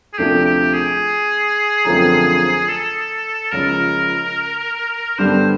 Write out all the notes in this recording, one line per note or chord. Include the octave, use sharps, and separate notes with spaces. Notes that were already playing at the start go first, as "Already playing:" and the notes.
G#4
D2 C3 F3 A3 D4 G4
G4
G#4
F#2 D3 F3 A3 C4
A4
C#2 C#3 F3 A#4
G2 D3 G3 B3 D4 C5